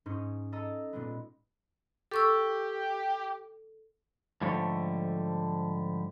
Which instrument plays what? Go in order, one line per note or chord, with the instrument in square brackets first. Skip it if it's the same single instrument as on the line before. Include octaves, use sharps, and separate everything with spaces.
[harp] G#2 C#4 D#4
A4 D#5 A5 A#5 E6
A#2 G#3 B3
[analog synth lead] G4 [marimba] A4 C#6 E6
[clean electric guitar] G#2 D3 F3 G3 A3 C#5